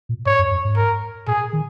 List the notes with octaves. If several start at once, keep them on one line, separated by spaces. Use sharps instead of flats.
A#2
G#2 C#5
F#2
F#2
G#2
A#4
A#2 G#4
D#3